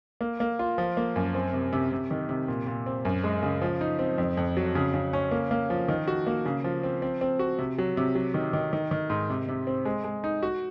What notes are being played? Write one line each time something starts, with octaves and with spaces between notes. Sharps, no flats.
A#3
A#3
F4
F3
A#3
F#2
C4
C3
C3
C3
D#3
C3
A#2
A#2
C4
F#2
G#3
C#3
F3
D#4
C4
F2
F2
F#3
C#3
C#3
C#4
A#3
A#3
F3
D#3
F#4
A#3
C#3
F3
C4
C4
C4
F#4
C3
F#3
C3
F#3
D#3
D#3
D#3
D#3
G#2
C3
C3
C4
G#3
G#3
D#4
F#4